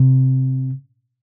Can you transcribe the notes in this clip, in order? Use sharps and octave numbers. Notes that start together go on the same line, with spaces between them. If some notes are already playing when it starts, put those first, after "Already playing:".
Already playing: C3